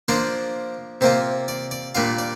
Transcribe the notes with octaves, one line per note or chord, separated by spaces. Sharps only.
F3 A#3 D4 F4 C5
C3 A#3 F4 C5
D5
D5
A#2 G3 D4 F4 F5
D5